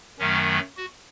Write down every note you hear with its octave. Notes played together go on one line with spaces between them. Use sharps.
F#2 D#3 F#3 A3 C#4
F#4